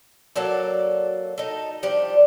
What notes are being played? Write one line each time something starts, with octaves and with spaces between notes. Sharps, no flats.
F#3 A#3 A4 D5
D#4 A4
F3 G3 D4 G4